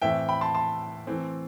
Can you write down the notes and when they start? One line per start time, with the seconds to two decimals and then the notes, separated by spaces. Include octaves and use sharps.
0.02 A2 E3 A3 C4 E5 G5
0.28 G5 B5
0.41 A5 C6
0.54 A5 C6
1.07 E3 A3 C4